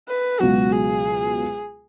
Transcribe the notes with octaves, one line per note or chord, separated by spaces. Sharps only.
B4
C#2 B2 F#3 F#4
G#4